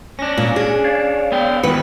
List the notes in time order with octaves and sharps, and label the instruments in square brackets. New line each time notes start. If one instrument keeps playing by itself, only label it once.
[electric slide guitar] C#4 D4 [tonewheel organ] A#6
[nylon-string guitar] A#2
G#4
[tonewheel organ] C#5 D5 F5
[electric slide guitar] B3 G5
[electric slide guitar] D#3 B3 [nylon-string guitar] B4 [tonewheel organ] F#5